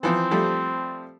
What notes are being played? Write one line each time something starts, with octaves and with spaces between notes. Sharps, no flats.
E3 F3 C4
F3 G3 A3